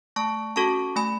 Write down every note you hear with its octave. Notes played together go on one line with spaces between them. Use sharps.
A3 A5 C#6
C#4 F#4 A4 A5 C#6
A3 G#5 B5